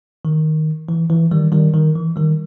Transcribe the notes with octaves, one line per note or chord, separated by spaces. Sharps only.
D#3
E3
E3
D#3 G3
D#3 G3
D#3
E3
D#3 G3